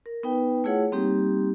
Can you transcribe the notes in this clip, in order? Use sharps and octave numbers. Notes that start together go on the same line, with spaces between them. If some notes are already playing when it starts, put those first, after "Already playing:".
A#4
B3 D#4 B4 G5
A3 E4 F4 G#4 C#5 F#5
G3 A#3 C4 D#4 G4